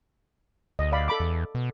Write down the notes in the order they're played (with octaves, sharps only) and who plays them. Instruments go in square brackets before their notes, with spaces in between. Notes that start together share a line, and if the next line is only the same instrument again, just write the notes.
[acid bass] D2 [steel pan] D#5
[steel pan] D5 F5 B5
A4 B5 D6
[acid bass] E2
B2